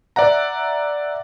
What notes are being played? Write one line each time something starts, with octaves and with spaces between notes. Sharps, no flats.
D5 E5 F#5 A#5